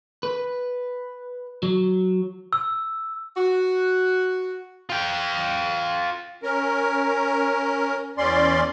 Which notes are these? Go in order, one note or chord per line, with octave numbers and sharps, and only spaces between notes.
B4
F#3
E6
F#4
F4 G5
C#4 A#4
E2 C#4 D5 C6